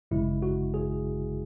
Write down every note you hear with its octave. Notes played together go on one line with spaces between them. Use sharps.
G#1 F#2 C#3 G#3 E4
F#4
G#4